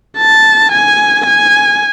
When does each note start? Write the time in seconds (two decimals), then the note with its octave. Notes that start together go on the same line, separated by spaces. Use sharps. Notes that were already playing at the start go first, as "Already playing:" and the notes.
0.18 A5
0.72 G#5
1.26 G#5